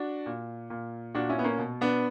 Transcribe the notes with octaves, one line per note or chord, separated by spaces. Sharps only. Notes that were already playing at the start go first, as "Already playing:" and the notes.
Already playing: D4 F#4
A#2
A#2
A#2 D4 F#4
C#4 E4
B3
A#3 C#4
B2
B3 D4